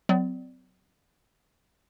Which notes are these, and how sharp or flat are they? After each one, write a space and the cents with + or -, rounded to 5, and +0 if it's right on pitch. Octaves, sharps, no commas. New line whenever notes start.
F#3 +0 C4 -45 D5 +0